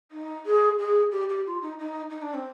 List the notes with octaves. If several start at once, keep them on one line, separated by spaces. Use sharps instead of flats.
D#4
G#4
G#4
G4
G4
F4
D#4
D#4
D#4
D4
C4